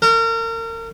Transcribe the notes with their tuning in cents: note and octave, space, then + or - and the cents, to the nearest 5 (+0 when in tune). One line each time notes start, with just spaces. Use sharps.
A#4 -35